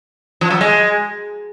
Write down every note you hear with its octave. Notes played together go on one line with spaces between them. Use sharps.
F3
F#3
G#3